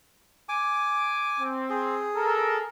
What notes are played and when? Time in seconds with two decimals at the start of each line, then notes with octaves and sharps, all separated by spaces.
0.49 G#5 D6
1.39 C4
1.70 G#4
2.15 A4 A#4